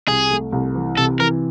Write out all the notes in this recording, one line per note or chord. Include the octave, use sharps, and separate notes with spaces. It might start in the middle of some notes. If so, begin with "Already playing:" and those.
C2 G#4
A3
C2
E3
C3 A4
E3 A#4